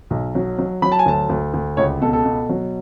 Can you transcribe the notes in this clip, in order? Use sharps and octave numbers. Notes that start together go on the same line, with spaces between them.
B1
F#3
F#3
F#3 B5
A5
G#5
D2 A5
D2
D2
C#2 C#5
B2 A4
A4
B2
F#3